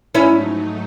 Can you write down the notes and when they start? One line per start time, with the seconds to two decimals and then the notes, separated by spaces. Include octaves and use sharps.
0.15 G#2 F#3 A3 C#4 D#4 E4